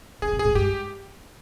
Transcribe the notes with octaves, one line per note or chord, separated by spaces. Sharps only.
C#3 G#4
C3
G#2 G#4
G2 G4